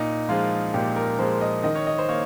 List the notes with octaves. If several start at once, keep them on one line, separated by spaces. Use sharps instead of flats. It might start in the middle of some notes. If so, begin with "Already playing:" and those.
Already playing: A#2 D#4
F3 G#3 F4
A#2 G4
A#4
F3 G#3 C5
D#5
D#3 D#5
C#5
D#5
C5
A#3 C#5